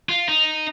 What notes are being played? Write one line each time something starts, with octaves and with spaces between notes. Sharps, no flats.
F4
D#4